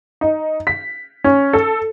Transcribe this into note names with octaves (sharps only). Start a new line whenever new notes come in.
D#4
B6
C#4
A4